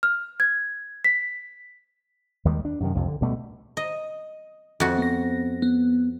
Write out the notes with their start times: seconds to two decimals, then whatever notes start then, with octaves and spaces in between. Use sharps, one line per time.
0.03 F6
0.40 G#6
1.04 B6
2.45 D#2 D#3 G3 G#3
2.65 D4
2.80 F#2 C3 D#3
2.95 C2 F2 C3
3.08 D3
3.21 D2 B2 G3 A3
3.77 D#5
4.80 F2 F#4
4.98 B3 A#6
5.62 B3